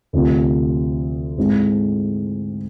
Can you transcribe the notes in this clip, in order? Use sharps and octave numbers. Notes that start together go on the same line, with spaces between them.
D2 C3 F3
G#2 G#3 C4 E4 G#4